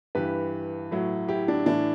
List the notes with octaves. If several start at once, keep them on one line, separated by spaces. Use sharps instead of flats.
G2 E3 G4 B4
A2 F#3
E4 G4
D4
A2 E3 D4